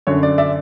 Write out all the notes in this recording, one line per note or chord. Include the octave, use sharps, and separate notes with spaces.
F#2 D3 C#5
D5
D5 E5